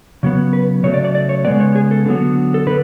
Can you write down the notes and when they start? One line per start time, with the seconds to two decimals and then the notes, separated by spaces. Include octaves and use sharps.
0.23 C#3 F#3 B3
0.53 B4
0.83 C#3 F#3 A3 C#5
0.94 D5
1.05 D5
1.15 D5
1.29 C#5
1.45 C#3 G#3 B3 D5
1.60 C#5
1.76 G#4
1.91 A4
2.06 D3 F#3 B3
2.54 A4
2.67 D3 B4